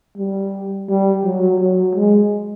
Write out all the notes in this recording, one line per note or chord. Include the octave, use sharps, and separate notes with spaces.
G3
G3
F#3
F#3
G#3